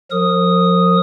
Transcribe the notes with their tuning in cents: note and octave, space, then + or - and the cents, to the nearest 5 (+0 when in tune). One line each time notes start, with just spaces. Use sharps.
F3 +30 A#4 -35 D#6 +0